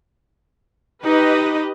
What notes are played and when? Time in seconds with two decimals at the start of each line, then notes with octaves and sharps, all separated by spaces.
1.04 D#4 G4 B4 D#5